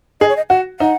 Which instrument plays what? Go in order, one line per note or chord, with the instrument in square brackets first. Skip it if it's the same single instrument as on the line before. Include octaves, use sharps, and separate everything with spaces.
[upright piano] G#4 [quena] D#5
[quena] C#5
D#5
[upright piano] F#4 [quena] F#5
[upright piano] D#4 [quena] F#5